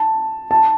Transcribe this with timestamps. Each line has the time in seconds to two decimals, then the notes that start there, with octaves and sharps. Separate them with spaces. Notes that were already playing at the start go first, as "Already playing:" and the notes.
Already playing: A5
0.51 A5